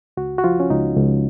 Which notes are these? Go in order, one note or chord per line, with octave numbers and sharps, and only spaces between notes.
C#2 F#4
F#4
F3 F4
C#4
C#2 D#4
C#2